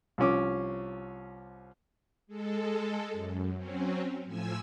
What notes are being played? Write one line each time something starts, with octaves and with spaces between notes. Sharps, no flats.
C2 F3 C#4 D6
G#3 A4
F#2
F#3 C4 C#4
A2 F3 G#5 E6